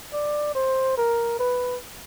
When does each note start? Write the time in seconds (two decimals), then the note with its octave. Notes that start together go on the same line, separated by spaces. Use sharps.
0.13 D5
0.55 C5
0.98 A#4
1.39 B4